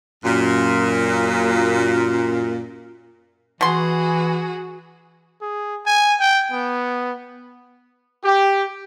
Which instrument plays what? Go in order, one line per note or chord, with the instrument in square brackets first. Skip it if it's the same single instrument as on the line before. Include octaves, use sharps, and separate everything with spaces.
[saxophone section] F#2 A#2
[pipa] B2 C6 [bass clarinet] E3 [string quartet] F#4 G#4
[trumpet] G#4
G#5
G5
B3
[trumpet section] G4